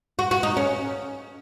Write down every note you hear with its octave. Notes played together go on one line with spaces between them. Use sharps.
F#4
F#4
D#4
C#4